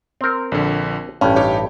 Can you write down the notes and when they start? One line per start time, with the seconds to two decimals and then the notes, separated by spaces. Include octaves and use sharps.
0.21 C4 A#4
0.52 A#1 D3
1.21 A1 G2 C#4
1.36 D#4 G4 C#5